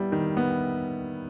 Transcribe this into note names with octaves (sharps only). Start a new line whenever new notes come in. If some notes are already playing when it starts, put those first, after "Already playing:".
Already playing: G3 B3 E4
D#3
B3